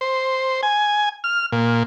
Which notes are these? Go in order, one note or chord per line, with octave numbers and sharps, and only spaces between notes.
C5
G#5
F6
A#2